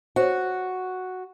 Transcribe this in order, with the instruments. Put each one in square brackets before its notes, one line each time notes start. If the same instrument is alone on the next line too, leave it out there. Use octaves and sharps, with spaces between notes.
[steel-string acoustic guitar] F#4 [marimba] C5 C#5